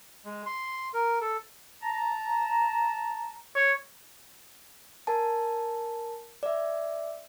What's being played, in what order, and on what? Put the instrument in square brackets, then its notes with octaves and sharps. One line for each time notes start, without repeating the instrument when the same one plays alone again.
[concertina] G#3
C6
A#4
A4
[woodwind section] A5 A#5
[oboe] C#5
[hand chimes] A#4 G#5 A5
D5 E5